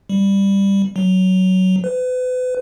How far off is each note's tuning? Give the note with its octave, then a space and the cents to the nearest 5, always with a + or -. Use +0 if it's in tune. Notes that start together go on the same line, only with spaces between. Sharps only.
G3 +10
F#3 +10
B4 +35